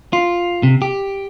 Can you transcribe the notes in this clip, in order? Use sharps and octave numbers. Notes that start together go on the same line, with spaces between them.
F4
C3
G4